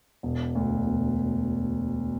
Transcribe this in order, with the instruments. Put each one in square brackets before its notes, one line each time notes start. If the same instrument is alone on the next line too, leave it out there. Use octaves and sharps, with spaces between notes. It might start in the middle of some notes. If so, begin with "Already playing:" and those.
[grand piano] E1
D2
E1